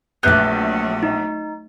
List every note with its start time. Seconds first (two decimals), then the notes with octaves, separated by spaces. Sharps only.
0.23 A#1 F#3 A3 B3 D5 E5 G6
1.03 D#4